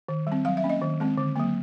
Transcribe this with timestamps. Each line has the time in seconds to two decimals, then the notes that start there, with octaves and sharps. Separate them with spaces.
0.09 D#3
0.27 G3 C4
0.45 F#3 F5
0.57 E5
0.64 A#3 C#4
0.69 D#5
0.82 D#3
1.00 G#3 C4
1.18 D3
1.36 F#3 A#3